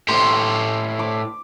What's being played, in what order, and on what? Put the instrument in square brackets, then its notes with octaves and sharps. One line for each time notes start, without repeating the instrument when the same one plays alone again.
[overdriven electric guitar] A2 G4 [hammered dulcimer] C6 D6
[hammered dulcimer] D6